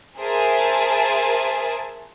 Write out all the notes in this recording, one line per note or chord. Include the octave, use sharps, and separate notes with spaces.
G#4 A#4 C5 E5 G#5 A5